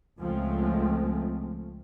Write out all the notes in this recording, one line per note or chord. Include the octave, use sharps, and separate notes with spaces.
C#2 F3 G#3 A3 C4